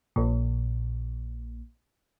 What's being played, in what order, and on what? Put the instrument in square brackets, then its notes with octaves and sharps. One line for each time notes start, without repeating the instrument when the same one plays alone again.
[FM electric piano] A#1 A#2